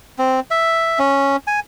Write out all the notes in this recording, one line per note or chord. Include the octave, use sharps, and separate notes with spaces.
C4
E5
C#4
G#5